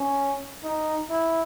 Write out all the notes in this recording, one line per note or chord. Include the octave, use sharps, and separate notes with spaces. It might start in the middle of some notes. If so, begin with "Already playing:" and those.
Already playing: C#4
D#4
E4